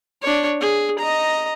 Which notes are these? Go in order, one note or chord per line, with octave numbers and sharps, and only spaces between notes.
D4 C#5
G#4
D#5 A#5